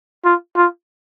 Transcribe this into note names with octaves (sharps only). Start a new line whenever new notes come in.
F4
F4